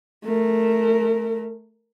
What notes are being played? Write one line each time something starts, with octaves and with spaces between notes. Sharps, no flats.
A3 A#4